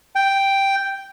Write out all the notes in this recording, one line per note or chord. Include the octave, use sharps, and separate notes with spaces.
G5